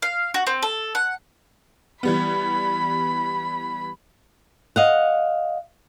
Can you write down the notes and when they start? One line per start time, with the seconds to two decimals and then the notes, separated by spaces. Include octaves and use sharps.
0.02 F5
0.34 F#4
0.47 C4
0.63 A4
0.95 F#5
2.03 E3 G3 B3 B5
4.76 D#5 F5 F#5